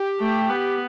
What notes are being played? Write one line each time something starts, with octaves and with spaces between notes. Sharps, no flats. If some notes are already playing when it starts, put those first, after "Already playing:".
Already playing: G4
A3
B3